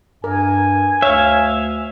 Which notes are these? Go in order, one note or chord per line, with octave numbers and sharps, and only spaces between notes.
G2 A#4 G#5
D2 C#5 E5 F5